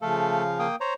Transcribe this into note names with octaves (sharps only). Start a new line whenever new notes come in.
C#3 F3 A3 A4 F5
A#3 G5 D#6
C5 C#5 A#5